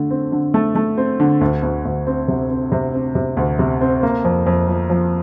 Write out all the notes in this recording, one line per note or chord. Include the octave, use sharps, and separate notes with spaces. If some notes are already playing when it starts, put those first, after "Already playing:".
Already playing: D3 A3
C4
D3
A3
A3
C4
D3
D2
D2
D2
C4
C3
C4
C3
C4
C3
D2
C3
C4
A#3
F2
F2
F3
F3